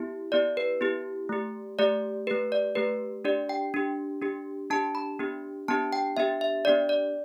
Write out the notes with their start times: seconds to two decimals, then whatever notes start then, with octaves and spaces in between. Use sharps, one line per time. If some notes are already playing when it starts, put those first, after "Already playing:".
Already playing: B3 E4 G4
0.32 B3 E4 G4 D5
0.57 B4
0.81 B3 E4 G4
1.29 A3 G4
1.79 A3 G4 D5
2.27 A3 G4 B4
2.52 D5
2.75 A3 G4 B4
3.25 D4 G4 D5
3.49 G5
3.74 D4 G4
4.22 D4 G4
4.70 D4 G4 A5
4.95 B5
5.19 B3 D4 G4
5.68 B3 D4 G4 A5
5.93 G5
6.17 B3 D4 G4 E5
6.41 E5
6.65 B3 D4 G4 D5
6.89 D5